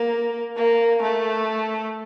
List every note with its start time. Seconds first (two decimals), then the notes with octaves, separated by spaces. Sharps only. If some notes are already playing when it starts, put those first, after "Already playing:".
Already playing: A#3
0.56 A#3
1.02 A3